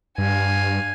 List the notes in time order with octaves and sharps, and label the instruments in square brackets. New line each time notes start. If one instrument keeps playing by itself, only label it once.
[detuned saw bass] G2 [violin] F5 G#5